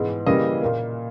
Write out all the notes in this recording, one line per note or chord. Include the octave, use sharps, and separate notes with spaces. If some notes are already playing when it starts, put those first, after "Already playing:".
Already playing: G#2 E3 G#3 B3
C#3 E3 G3 A#3 D#5
A#2 A#3